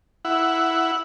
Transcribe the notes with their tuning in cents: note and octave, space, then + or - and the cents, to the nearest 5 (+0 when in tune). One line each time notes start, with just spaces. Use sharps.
E4 +0 F#5 +0